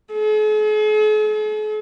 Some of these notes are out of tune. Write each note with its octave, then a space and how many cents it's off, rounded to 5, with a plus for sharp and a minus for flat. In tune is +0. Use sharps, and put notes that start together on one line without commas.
G#4 +45